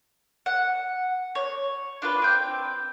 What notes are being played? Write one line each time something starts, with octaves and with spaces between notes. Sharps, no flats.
F#5
C#5
D4 F4 B4
C4 G5